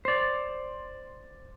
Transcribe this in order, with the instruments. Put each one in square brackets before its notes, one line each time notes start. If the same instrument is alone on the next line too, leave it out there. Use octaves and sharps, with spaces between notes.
[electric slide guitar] C5 D5